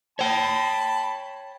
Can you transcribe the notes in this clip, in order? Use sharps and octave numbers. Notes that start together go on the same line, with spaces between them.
C#5 G5 A5 B5